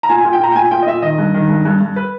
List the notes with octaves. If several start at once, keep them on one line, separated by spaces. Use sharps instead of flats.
A#5
A#2 G#5
G#5
A#2
G5
A#2 A#5
G5
A#2 G#5
A#2 G5
D#5
A#2 E5
D#3 D#5
G2
D#3
G2
G2
G2
B4